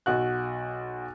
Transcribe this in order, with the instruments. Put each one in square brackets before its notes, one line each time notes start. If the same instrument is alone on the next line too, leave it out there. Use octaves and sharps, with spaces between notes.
[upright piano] B1 F#4 F#6